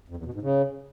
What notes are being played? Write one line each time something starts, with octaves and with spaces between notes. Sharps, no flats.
F2
E2
B2
G#2
C#3